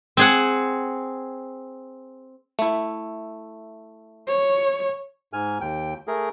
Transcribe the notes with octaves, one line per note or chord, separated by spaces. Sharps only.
C4 G#4 F#5
A3 E4
C#5
G#2 G#5 F6
D#2 G5
A3 G#4 A#4